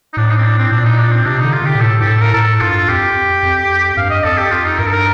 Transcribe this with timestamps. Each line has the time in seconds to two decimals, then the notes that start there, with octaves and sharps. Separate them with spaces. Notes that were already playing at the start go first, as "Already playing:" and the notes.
0.14 D#4
0.17 A2 D4
0.30 D#4
0.37 C4
0.44 D4
0.58 C4
0.72 A#2 D4
0.84 D#4
0.98 D4
1.12 C4
1.26 C3 D4
1.39 D#4
1.44 D3
1.53 F4
1.62 C3 G4
1.75 A#2
1.80 A2 A4
2.01 G2 G4
2.07 A2 A4
2.21 A#4
2.34 A2 A4
2.61 G2 F4
2.88 F2 G4
3.43 F2
3.97 G2 F5
4.11 D#5
4.24 F2 A4
4.37 G4
4.51 F4
4.65 D#4
4.79 G2 A#4
4.87 A4
4.92 A#4